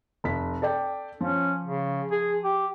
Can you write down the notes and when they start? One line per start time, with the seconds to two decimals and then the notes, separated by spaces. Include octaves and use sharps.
0.24 F1 B6
0.62 A4 D5 G5
1.21 F3 C#4
1.64 C#3
2.11 G#4
2.44 G4